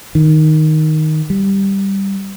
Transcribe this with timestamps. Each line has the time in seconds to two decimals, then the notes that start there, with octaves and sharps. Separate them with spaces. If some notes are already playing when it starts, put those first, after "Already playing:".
0.15 D#3
1.30 G3